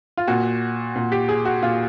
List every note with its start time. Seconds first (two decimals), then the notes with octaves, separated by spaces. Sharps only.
0.17 F4
0.27 A#2 F#4
0.96 A#2
1.12 G4
1.29 G#4
1.45 F#4
1.63 A#2 F4